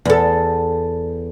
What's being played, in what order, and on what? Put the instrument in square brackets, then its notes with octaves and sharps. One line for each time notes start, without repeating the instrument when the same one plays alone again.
[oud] E2 A4